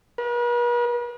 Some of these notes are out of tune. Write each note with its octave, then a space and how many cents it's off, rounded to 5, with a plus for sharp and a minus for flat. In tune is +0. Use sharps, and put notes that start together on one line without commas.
B4 -45